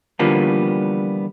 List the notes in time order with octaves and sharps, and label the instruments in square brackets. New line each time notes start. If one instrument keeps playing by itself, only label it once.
[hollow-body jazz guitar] D3 E3 F3 G3 A#3 B3